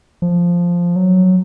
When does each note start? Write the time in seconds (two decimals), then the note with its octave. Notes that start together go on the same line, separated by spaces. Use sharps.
0.22 F3
0.96 F#3